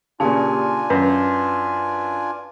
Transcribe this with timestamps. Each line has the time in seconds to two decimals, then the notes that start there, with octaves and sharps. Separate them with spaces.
0.20 A#2 C#3 D4 F4 G4 F5 G#5 A5
0.90 F#2 B4